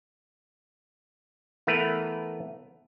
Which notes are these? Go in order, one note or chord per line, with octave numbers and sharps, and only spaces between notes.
E3 A3 B3 A#4 B4